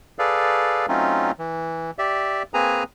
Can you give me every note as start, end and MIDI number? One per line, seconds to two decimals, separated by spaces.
0.19 0.86 68
0.19 0.86 69
0.19 0.86 71
0.19 0.86 74
0.19 0.86 77
0.88 1.31 54
0.88 1.31 57
0.88 1.31 60
0.88 1.31 61
0.88 1.31 63
0.88 1.31 65
1.39 1.91 52
1.99 2.43 67
1.99 2.43 74
1.99 2.43 76
2.54 2.83 58
2.54 2.83 60
2.54 2.83 68
2.54 2.83 71
2.54 2.83 80
2.54 2.83 82